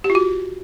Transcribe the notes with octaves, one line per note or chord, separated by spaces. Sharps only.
G4
F4
F#4